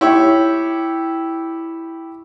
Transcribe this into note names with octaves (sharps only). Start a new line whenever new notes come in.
E4 G4 C#5